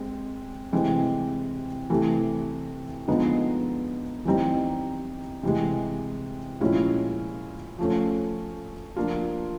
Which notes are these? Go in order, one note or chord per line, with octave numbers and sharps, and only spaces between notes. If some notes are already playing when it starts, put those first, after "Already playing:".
Already playing: G#3 C4
C3 E3 G#3 C4
C3 E3 A3
D3 F3 G#3 B3 D#4
E3 G3 C4 D#4
C3 E3 G#3
A#2 F3 G#3 C#4 E4
F3 A3 C#4
F3 A#3 D4 F4